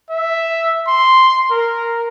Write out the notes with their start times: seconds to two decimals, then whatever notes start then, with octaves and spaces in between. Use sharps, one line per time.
0.10 E5
0.87 C6
1.51 A#4